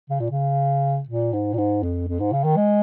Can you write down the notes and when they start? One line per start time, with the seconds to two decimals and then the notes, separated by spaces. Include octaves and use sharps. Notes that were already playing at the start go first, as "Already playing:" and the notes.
0.10 C#3
0.20 A#2
0.31 C#3
1.09 A#2
1.33 G#2
1.53 A#2
1.58 G#2
1.83 F2
2.08 F2
2.20 G#2
2.32 C#3
2.44 D#3
2.57 G#3